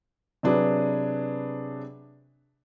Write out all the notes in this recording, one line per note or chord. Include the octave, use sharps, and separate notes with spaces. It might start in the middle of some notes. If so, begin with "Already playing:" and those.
C3 F#3 D4 G#4 B4